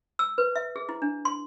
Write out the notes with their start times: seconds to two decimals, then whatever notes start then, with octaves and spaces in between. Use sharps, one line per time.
0.19 E6
0.38 B4
0.56 E5
0.76 G#4
0.89 E4
1.02 D4
1.25 C6